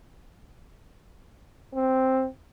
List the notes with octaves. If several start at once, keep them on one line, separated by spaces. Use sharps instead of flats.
C4